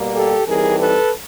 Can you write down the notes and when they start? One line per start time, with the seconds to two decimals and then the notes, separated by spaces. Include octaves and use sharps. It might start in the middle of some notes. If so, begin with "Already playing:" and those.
Already playing: B2 G3 A#3
0.15 G4 A4
0.47 E3 G3 C4 D#4 G#4 A#4
0.79 A4 B4